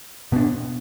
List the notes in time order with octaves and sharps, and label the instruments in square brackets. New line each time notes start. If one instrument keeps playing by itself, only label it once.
[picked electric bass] B2 B3 D4